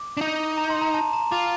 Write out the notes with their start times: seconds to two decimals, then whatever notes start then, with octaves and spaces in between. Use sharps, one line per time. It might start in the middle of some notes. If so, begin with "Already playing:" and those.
Already playing: D6
0.17 D4
0.21 D#4
0.57 A#5
0.70 C6
0.81 A#5
0.94 A5
1.13 A#5
1.32 F4 D6